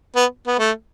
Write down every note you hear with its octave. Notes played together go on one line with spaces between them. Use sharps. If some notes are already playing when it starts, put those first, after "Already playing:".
B3
B3
A3